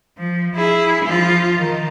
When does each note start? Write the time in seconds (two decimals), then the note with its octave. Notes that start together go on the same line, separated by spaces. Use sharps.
0.18 F3
0.55 E4 G#4
1.05 F3 F4
1.57 D#3